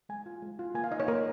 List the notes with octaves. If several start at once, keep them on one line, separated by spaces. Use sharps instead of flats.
G#3 G#5
F4
G#3
F4
A#3 G#5
F5
D#4 D#5
C#5
A#3 A#4